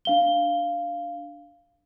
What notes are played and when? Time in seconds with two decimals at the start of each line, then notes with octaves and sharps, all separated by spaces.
0.05 D4 F5 G7